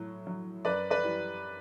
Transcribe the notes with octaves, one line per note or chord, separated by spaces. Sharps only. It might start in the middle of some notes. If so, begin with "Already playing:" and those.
Already playing: A2 F#3
F#3
F#2 B4 D5
B4 D5
E3 G3